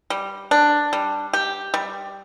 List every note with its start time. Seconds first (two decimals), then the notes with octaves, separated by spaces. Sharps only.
0.10 G3
0.51 D4
0.93 G3
1.33 G4
1.74 G3